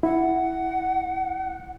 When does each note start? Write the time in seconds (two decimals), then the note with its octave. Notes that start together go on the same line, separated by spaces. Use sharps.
0.03 E4 F#5